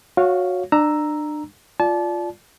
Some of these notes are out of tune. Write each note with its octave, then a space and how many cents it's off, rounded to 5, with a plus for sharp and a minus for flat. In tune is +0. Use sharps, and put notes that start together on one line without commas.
F#4 -20 C#5 +0 F5 +0
D4 +30 A#5 +0 E6 +0
F4 +0 D5 -5 A5 -30